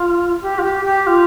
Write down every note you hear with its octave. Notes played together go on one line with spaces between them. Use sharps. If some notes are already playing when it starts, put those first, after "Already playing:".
Already playing: F4
G4
F4
G4
G4
F4